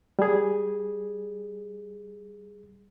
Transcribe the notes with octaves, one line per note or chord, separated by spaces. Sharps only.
G3 G#4